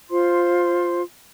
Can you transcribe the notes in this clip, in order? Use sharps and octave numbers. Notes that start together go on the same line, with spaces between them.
F4 C5 C6